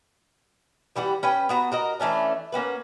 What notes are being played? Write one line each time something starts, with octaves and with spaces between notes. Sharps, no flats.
E3 G3 F#4 G4
C#4 B4 G5
B3 F#4 A#5
F#4 A#4 D#5
E3 A3 C#4 D4
A#3 C#4 F#4 B4